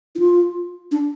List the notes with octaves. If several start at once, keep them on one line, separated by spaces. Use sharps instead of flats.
E4
F4
D4